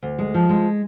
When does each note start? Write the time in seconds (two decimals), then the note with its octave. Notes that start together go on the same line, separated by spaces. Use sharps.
0.03 D2
0.19 G#3
0.34 F3
0.49 G#3